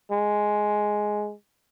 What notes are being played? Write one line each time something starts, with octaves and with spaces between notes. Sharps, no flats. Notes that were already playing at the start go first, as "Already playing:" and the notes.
G#3